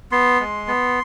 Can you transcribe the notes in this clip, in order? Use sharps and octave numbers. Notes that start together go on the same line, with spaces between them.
B3 C6
G#3
B3